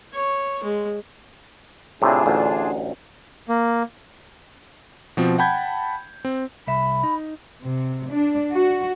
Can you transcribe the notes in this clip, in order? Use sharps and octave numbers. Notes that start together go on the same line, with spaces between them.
C#5
G#3
A2 C3 D4 F4 G#4
A1 D2
A#3
B2 F3 C4
F#5 G5 A5 B5 G6 G#6
C4
C2 E5 B5
D#4
C3
D4
F#4